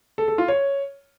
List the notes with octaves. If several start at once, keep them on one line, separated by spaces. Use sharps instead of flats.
A4
A4
F4
C#5